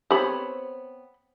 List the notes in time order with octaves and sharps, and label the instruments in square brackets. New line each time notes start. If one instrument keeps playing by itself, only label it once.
[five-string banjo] B3 C4 C#5 [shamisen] G4 B5